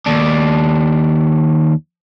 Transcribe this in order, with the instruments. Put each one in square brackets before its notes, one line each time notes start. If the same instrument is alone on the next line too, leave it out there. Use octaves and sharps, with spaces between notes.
[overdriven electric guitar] D#2 D4